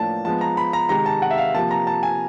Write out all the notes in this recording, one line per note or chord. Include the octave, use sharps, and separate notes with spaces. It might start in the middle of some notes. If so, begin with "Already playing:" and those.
Already playing: A2 F3 A#3 D4 A5
F3 G#3 B3 A5
A#5
B5
A#5
C3 D#3 G#3 A#5
A5
F#5
E5
F5
C3 F3 A#3 A5
A#5
A5
G#5